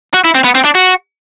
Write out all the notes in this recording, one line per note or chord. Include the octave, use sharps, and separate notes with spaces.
F#4
E4
C4
B3
C4
D4
F#4